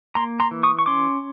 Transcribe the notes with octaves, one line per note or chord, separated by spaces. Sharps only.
A#3 A#5 C6
A#5 C6
E3
C#6 D#6
C#6
C#4 C6 D6